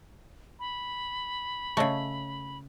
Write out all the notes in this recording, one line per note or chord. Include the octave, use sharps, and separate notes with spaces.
B5
C#3 A3 C#5 D#5 C#6